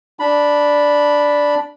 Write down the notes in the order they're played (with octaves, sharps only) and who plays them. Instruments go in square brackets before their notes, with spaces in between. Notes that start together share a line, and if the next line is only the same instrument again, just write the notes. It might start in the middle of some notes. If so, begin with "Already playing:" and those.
[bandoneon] D4 B5